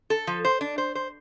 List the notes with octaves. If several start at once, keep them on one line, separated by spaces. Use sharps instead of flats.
A4
F3
C5
D4
C5
C5